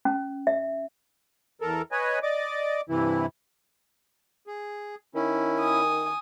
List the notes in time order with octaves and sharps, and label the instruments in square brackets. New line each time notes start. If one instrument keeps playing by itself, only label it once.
[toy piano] C#4
E5
[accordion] E2 A4 A#4
B4 C#5 D#5 G#5
D5 D#5 D6
G2 C3 E3 E4
G#4
[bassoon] D#3 [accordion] C#4 E4
[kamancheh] G#5 D#6